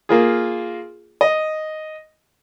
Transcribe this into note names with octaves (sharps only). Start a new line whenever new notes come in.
A#3 F4 G#4
D#5